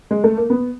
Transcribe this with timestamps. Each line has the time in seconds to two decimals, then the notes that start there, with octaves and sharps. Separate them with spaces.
0.11 G#3
0.24 A3
0.37 A#3
0.50 B3